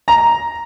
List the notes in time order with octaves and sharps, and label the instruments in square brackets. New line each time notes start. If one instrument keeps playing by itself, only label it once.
[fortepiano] A#5